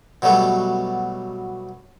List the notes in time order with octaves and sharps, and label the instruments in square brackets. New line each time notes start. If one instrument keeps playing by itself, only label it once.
[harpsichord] B2 F#3 G3 A3 B3